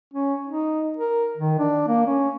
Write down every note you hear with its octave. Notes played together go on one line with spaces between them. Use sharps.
C#4
D#4
A#4
D#3
D4
A#3
C#4